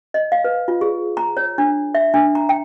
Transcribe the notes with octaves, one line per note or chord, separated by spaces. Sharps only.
D#5
F5
B4
F4
G#4
A#5
C#5
D4
E5
D4
A#5
G5